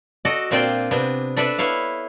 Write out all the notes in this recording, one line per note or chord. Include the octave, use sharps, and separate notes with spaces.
F#4 A4 D5 D#5
A#2 C4 D4 F4 D5 G5
C3 B3 D4
D4 A4 B4 D5 E5
B3 E4 C#5 F5